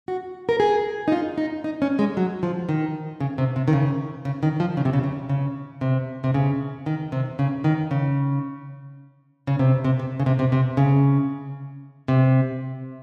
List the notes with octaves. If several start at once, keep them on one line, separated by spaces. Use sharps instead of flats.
F#4
A#4
G#4
D#4
F4
D#4
D#4
C#4
G#3
F#3
F3
D#3
C#3
C3
C3
D#3
C#3
C#3
D#3
F3
C#3
C3
C#3
C#3
C#3
C3
C3
C#3
D#3
C3
C#3
D#3
C#3
C#3
C3
C3
C3
C#3
C3
C3
C3
C#3
C3